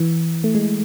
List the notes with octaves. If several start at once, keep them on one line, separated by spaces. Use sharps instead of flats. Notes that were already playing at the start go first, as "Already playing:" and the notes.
Already playing: E3
A3
G#3